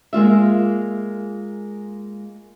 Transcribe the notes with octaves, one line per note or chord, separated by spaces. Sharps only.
G#3 A#3 F4 E5